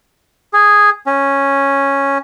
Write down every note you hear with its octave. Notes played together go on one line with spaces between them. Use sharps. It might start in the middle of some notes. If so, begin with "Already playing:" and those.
G#4
C#4